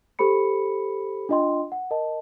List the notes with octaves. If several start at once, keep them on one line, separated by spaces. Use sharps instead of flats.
G4 A4 C5 B5 C#7
D4 F4 D#5 G5 C6
F#5
A#4 D#5 A5